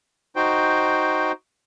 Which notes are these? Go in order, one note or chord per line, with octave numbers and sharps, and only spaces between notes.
D#4 F#4 C5 G5